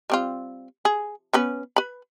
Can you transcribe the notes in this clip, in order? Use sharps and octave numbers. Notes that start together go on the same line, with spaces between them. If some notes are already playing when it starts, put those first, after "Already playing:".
G3 C4 F4
G#4
B3 C#4 B4
B4 B5